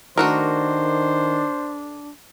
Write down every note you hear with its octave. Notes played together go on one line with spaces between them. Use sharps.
D#3 A3 D4 F#4 A#4 C5